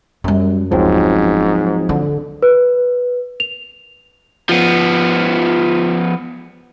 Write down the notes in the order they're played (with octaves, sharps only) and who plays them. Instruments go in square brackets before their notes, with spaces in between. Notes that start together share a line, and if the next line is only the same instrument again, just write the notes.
[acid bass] F#2 [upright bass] F#3 G3
[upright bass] D1 [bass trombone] G#2 [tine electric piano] F3 F#3 C4
[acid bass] D3 [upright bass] D4
[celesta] B4
F7
[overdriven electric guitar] F3 B3